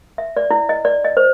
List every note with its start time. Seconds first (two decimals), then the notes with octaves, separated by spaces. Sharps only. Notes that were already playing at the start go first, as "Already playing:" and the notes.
0.18 E5
0.37 D5
0.51 E4
0.69 D#5
0.85 D5
1.04 D#5
1.17 C5